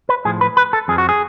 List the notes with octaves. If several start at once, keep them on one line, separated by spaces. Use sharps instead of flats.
B4
A2 F3 G#4
B4
B4
A4
F2 F3 G#4
F#4
G#4